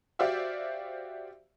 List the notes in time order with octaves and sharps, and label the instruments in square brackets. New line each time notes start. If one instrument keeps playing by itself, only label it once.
[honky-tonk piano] F#4 G4 C5 D5 E5 F5